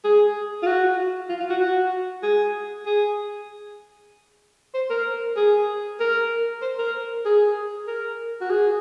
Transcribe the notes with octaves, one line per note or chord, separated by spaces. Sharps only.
G#4
F4
F#4
F4
F4
F#4
F#4
G#4
G#4
C5
A#4
G#4
A#4
C5
A#4
G#4
A#4
F#4
G#4